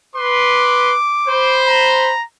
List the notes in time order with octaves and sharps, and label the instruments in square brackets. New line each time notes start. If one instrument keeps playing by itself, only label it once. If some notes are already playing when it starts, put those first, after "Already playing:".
[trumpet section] B4 C6 [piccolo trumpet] D6
[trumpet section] C5 B5
[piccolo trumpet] A#5